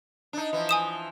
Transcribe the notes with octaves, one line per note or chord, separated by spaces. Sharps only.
D4 D#4
E3 F3
G#5 D#6 E7